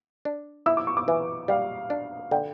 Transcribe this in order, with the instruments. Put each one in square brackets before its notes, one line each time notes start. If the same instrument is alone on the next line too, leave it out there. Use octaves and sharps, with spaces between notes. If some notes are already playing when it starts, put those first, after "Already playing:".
[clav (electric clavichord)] D4
[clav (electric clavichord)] E4 [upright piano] E6
[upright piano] D6
C#6
D6
[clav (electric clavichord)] E3
[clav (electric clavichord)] G3 [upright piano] F5
[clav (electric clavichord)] D4
[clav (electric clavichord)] D3 [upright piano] G5